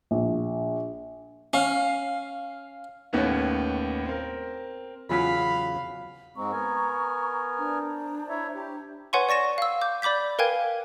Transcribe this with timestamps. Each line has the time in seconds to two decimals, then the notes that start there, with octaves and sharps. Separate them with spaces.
0.11 A#1
1.53 C#4 F5
3.13 D#2 A2 D#3 B3 C#4
4.05 C4 A#4
5.09 E2 C#3 F#3 F4 F5 G#5 B5 B6
6.36 G#2 G#3 C4 A#5 C#6
6.52 B3 A#4 G#5
7.58 D4 C5 A#5
8.29 E4 C#5 E5
8.55 G4
9.13 B4 C#5 F#5 G#5 C6 C#6
9.29 D5 C#6 A#6 E7
9.58 F5 E6
9.81 D6 G6
10.02 D5 B5 D6 G6 B6
10.39 A#4 B4 F5 G5 G#5 G#6